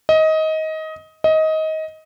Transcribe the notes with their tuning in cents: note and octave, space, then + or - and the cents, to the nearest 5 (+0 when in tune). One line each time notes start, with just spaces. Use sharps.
D#5 +20
D#5 +20